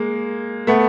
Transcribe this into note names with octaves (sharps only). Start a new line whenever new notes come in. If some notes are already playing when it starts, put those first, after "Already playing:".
Already playing: G#3 A#3
A3 B3